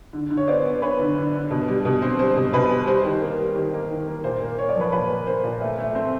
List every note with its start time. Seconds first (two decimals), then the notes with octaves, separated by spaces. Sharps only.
0.13 D3
0.30 D3
0.37 C#5
0.47 B3 C5 D5
0.65 B3
0.82 B3 B4 C#5
0.99 D3
1.17 D3
1.34 D3
1.51 B2
1.68 G3
1.85 B2
2.02 C4
2.19 G3 C5
2.36 B2
2.53 B2 B4
2.70 G3
2.87 G3 C5
3.05 D#3
3.21 A#3
3.38 G3
3.56 D#3
3.74 A#3
3.90 D#3
4.08 A#3
4.24 A#2 C5
4.41 A#3
4.58 A#3 C#5
4.69 D5
4.76 F3 B4 C#5
4.92 A#2 B4
5.09 A#3
5.27 A#3 C5
5.44 A#2
5.61 A3
5.78 A3
5.95 C4